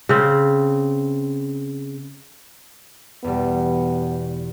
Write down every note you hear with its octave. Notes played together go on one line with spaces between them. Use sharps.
C#3 C4
E2 B2 G3 B3